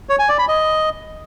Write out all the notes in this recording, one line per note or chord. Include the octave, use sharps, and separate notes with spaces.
C#5
G#5
D5
B5
D#5